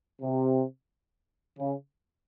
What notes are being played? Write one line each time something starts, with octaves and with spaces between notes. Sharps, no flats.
C3
C#3